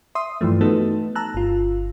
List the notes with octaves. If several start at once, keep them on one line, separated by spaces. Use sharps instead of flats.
E5 C6 D#6
G2 E3 F3 A3
A3 B3 D#4 F#4 A4
A5 A#5 E6 F#6
G1 F4